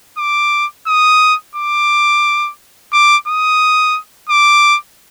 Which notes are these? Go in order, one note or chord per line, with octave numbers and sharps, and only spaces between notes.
D6
D#6
D6
D6
D#6
D6